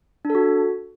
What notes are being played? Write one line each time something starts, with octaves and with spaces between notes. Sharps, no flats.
D4
A4
F#4